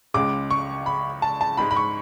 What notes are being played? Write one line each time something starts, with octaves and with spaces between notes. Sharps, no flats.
C#2 C#3 G#3 D6
C#6
B5
A5
A5
G#2 G#3 B5
B5
C#6